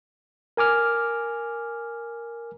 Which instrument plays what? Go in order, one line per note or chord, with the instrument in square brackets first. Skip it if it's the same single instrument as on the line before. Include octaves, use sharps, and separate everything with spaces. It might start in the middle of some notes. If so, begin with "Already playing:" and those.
[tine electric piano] A#4 G#5 D6 F6